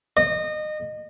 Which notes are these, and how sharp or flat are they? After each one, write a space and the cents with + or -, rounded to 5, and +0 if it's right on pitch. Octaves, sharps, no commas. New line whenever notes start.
D#5 -25